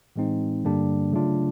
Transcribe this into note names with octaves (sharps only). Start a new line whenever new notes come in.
A2 E3 G#3 C4 D#4
G2 D3 G3 A#3 D4
C#3 F#3 A3 D4 F4